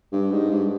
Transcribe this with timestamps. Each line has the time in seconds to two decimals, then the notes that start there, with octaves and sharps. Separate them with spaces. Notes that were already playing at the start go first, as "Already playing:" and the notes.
0.13 G2
0.31 G#2
0.50 G2